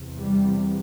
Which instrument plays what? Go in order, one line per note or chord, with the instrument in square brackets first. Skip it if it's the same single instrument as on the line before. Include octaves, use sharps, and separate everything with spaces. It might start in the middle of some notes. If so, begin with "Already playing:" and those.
Already playing: [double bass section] E2 C3
G3